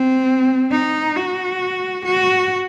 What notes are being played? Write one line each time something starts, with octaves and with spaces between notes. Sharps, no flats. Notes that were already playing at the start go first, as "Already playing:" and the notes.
Already playing: C4
D#4
F#4
F#4